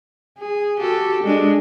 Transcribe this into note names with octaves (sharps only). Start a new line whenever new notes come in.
G#4
F#4 G4 A4
G#3 D4